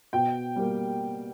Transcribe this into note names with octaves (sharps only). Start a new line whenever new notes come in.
B2 G5
G3 A#3